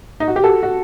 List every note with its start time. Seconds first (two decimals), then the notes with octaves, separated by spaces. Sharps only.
0.20 D#4
0.28 F#4
0.36 G4
0.43 F#4 A4
0.63 F#4